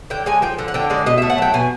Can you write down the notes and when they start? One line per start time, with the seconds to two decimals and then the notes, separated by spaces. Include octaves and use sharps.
0.10 D3 G5
0.26 G#3 G#5
0.42 F3 G5
0.59 D3
0.68 F#5
0.74 D3 G5
0.90 G#3 D5
1.06 B2 D#5
1.18 E5
1.22 A3
1.30 F#5
1.38 F#3 G5
1.54 B2 G#5